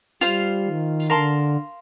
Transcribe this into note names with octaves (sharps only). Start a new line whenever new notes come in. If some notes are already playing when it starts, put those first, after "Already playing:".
G3 F4 C5 F5
D#3
D3 A#4 F5 A5 C6